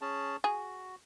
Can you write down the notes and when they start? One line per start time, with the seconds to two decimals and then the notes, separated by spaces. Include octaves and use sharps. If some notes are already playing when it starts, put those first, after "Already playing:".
0.01 C#4 G#4 A5
0.44 F#4 G#4